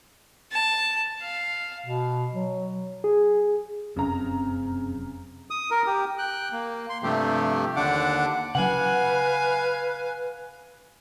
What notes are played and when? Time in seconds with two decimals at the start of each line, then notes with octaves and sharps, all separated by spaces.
0.52 A5
1.22 F5
1.84 B2
2.34 F#3
3.04 G#4
3.96 F1 F#2 C#3 C4 A#5
5.51 D#6
5.71 A#4
5.86 G4
6.18 G5 F#6
6.52 A#3
6.89 C6
7.03 G2 C3 F3 A3 G4
7.76 D#2 D3 D4 F#5 D6
8.55 C#3 F#3 B4 F5 F#5 G#5